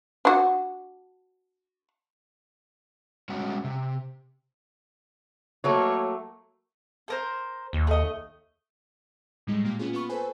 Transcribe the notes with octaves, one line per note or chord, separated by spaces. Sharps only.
D4 F#4
G3 G#3 C#4 F#4 C#5 F#5
C3
F#3 A3 A#3 C#5
A4 A#4 C5
D#2
A3 D#5
A2 G3 G#3 D#4
A#2 A#3 G4
A#3 B3 C#4 F4 G#4
B3 F4 B5 C#6
A4 B4 C5 G#5